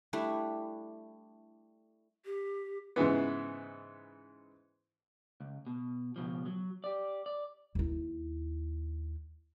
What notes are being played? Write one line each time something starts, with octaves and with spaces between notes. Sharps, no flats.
G3 A3 D4 E4
G4
G#2 C#3 E3 B3
C#2
B2
C#2 B2 F3
F#3
G4 D5
D5
D#2 E4